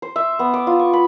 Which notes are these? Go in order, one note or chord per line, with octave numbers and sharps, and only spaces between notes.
C5
E5
B3
D6
F4
C#6
B5